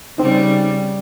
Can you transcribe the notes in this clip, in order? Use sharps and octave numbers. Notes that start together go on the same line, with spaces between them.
C#3 G3 C4 D#4